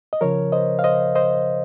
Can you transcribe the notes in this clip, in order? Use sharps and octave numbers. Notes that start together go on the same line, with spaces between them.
D#5
C#3 F3 A#4 C#5
C5 D#5
F5
C5 D#5
C5 D#5